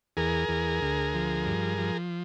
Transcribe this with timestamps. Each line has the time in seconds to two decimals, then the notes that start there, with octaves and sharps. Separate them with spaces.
0.17 E2 G#4 A#4
0.49 E2
0.82 D2
1.14 F3
1.46 G2
1.78 F3